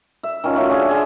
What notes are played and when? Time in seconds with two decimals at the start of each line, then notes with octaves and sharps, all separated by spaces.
0.23 E5
0.44 D#3 C#4 F4
0.56 A3 C#4 F#4
0.70 D4 G#4 F5 G#5
0.89 G#4 E5 C6